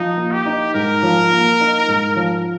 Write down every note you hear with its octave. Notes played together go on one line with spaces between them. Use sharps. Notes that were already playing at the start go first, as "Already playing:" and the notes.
Already playing: F3 D#4
A#3
G4
D#4
G#2 A#4
F3
A#3
D#4
G#2
F3